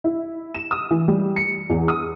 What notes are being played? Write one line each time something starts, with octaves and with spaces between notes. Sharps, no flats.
E4
E7
D#6
E3
G3
C#7
E2
D#6